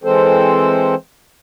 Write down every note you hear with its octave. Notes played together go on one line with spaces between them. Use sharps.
E3 G#3 C4 A4 C5